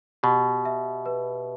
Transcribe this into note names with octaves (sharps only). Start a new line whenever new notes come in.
B2 G4
E5
B4